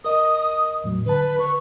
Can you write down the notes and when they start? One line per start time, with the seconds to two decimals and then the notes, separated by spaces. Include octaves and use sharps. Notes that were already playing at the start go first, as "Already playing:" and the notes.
0.05 A#4 D#5 D#6
0.84 E2 A2 F#3
1.06 D3 B4 A5
1.39 B4 C#6